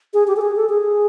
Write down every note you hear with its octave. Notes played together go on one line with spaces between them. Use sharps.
G#4
G4
A4
G#4
A4
G#4